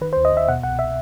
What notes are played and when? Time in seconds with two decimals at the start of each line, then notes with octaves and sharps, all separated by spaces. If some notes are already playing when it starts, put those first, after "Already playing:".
0.01 D#3 B4
0.13 C5
0.17 D#2
0.25 D#5
0.32 D#2 E5
0.48 B2 F#5
0.63 C2 F#5
0.79 E5